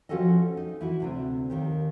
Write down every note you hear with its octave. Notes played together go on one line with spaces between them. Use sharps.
F3 C#4 F#4 G4 A4 D#5
D#4
E3 E4 F#4
D2 C3 D4
D#2 D#3 G4